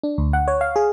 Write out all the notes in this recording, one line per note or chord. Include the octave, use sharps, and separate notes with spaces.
D4
D2
F#5
C#5
F5
G#4